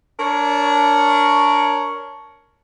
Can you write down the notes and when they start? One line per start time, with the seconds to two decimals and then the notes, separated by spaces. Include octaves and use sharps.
0.17 D4 A#4 C#5